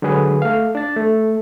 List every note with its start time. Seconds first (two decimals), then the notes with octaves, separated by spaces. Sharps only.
0.02 D3 F#3 G#3 G#4 B4
0.42 A3 F5
0.75 D4 A6
0.96 A3